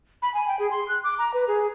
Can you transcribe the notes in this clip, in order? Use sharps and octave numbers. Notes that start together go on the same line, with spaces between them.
B5
G#5
G5
G#4
C6
F#6
D6
A#5
B4
G#4